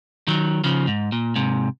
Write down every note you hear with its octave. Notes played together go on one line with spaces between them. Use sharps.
D#3 F#3
C#3 F3
G#2
A#2
G#2 C3